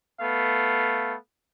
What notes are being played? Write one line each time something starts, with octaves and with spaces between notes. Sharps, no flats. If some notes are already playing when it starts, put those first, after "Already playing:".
A3 B3 F5